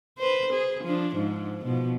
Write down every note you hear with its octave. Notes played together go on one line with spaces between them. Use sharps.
B4 C5
G#4
F3 D4
G#2 F3
B2 F3